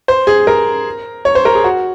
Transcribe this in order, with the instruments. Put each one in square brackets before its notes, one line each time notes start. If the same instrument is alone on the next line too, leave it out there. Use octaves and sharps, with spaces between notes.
[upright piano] C5
G#4
A#4
C#5
C5
A#4
G#4
F#4